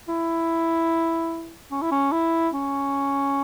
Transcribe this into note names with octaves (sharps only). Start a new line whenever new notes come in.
E4
C#4
E4
C#4
E4
C#4